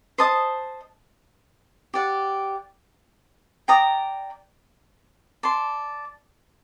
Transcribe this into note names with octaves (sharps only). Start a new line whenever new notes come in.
C5 D#5 A5 D#6
G4 D5 F#5
D5 G5 A#5 D#6
D5 A5 C6